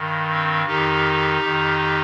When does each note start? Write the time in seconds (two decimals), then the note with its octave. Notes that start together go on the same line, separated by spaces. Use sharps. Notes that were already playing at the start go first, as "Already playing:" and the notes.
Already playing: G2 D#3
0.29 C4
0.67 F2 D#3 D#4 G4
1.42 F2 D#3